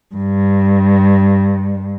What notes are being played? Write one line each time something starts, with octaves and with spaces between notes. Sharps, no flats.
G2